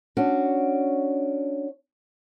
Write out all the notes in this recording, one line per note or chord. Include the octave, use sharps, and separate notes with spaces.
C#4 D4 F#4